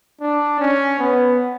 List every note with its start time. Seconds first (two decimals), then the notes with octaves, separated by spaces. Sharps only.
0.21 D4
0.60 C#4
0.99 B3